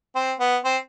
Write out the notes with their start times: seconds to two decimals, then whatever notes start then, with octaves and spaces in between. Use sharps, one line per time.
0.16 C4
0.39 B3
0.65 C4